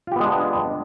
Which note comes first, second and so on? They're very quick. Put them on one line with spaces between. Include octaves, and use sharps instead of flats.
F4 G4 B3 G#3 D4